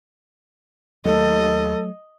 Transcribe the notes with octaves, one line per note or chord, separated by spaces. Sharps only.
D#2 F#3 A3 A4 D#5